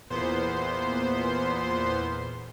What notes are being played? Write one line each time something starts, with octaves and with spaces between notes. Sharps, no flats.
E2 A#2 B3 C5 C6